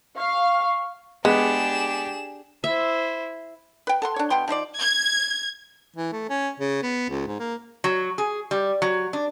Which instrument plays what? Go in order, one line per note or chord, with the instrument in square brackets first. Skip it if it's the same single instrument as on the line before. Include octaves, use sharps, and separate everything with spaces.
[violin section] F5 [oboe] C#6
[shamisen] G#3 [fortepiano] B3 [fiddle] D4 G4 [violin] G#4 E7
[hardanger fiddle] E4 C5 [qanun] E5
[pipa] B4 G5
A4 F#5 C6
D4 C#5
B2 B3 G5 C6
F3 D#4 C5 D5
[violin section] G#6
[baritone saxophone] E3
A3
C#4
C#3
B3
C#2
G#2
A#3
[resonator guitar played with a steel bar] F#3
G#4
G3
F#3
D4